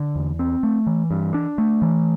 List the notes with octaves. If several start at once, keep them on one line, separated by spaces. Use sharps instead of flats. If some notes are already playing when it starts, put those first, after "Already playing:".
Already playing: D3
E2
C4
A3
E3
G2
D4
A3
E3